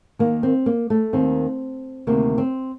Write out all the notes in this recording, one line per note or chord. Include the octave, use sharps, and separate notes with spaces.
D#2 D#3 A#3
C4
A#3
A3
D#2 D#3 C4
D2 C3 D#3 A#3
C4